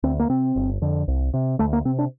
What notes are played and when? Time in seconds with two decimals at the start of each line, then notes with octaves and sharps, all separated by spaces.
0.03 D2 C4
0.19 A#3
0.29 C3 C4
0.56 G1
0.82 F2 D3
1.08 C2
1.34 C3
1.59 D2 A3
1.73 A#3
1.85 C3 C4
1.99 D4